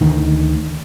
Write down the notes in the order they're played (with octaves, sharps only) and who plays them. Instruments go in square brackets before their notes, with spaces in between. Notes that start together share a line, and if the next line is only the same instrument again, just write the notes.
[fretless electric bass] D2 D#3